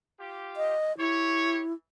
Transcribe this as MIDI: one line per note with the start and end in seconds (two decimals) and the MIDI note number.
0.20 0.75 65
0.20 0.75 67
0.57 0.97 75
0.98 1.73 64
0.98 1.63 67
0.98 1.63 73